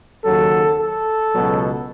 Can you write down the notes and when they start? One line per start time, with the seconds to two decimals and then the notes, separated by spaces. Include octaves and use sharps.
0.25 D#2 C#3 F#3 A4
0.79 A4
1.33 C#2 B2 F#3